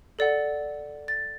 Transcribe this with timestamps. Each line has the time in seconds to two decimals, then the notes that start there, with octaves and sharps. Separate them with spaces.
0.19 A4 D5 F#5
1.08 A6